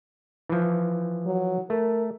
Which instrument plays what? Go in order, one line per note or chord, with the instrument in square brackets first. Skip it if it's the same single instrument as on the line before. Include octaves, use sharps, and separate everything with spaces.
[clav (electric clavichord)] E3 F3
[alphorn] F#3
[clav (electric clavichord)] A3 [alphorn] A#4